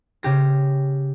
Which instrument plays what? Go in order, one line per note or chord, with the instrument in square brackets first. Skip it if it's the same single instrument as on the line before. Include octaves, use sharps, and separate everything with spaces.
[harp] C#3 G4 A#6